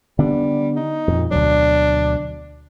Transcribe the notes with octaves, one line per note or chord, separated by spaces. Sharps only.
D3 G3 B3 D4
D#4
F2 A#2
D2 B2 F#3 D4